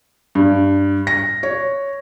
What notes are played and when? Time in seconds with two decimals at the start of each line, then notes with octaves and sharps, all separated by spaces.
0.35 G2
1.07 A#6
1.43 C#5